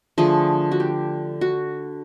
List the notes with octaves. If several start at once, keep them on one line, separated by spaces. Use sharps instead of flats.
D3 F3 A3 G#4
F#4
G4
F#4